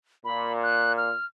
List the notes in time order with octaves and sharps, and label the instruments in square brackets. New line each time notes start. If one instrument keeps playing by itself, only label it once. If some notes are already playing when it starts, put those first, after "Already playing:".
[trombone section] A#2 [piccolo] B5
[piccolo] F#6
F6